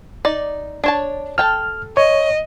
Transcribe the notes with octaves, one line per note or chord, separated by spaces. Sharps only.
D#4 D5
D4 C#5 A5
A4 G5 A5 F6
C#5 D#5